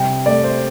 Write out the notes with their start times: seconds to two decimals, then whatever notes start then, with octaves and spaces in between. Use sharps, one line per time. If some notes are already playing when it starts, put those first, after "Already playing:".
Already playing: C3 G3 G5
0.26 A3 D5
0.44 C5